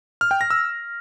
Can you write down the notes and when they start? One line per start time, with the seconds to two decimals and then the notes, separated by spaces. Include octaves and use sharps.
0.21 F6
0.31 G5
0.41 A#6
0.50 E6